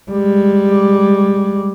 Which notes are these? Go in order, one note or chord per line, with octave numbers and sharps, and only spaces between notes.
G3 G#3